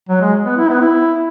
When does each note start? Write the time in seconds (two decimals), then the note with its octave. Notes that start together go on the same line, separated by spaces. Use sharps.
0.09 F#3
0.21 G#3
0.45 B3
0.57 E4
0.69 B3
0.80 E4